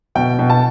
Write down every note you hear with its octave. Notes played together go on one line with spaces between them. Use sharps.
B2 G5
B2
A5